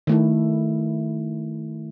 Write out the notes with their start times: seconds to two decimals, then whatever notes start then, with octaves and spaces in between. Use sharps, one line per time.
0.07 D#3 A3 E4